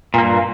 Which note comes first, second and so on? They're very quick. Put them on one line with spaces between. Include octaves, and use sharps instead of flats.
A#2 A#3 G2